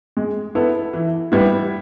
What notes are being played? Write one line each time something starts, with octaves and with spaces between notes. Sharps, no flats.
G#3
B3 E4 A4
E3
G3 B3 E4